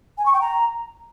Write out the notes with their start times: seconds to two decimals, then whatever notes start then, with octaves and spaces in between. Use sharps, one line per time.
0.18 G#5
0.26 C#6
0.33 G5
0.41 A#5